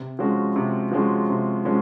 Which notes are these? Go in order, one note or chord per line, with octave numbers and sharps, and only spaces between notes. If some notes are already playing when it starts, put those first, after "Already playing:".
Already playing: C3
F3 G#3 C#4 F#4
C3
F3 G#3 C#4 F#4
C3
F3 G#3 C#4 F#4